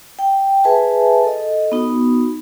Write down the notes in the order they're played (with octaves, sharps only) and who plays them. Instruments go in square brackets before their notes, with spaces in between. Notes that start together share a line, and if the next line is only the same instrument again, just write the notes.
[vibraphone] G5
G#4 B4 E5 G#5 A5
A4 D#5
B3 D#4 F#4